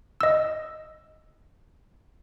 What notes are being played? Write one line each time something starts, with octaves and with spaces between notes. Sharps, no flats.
D#5 E6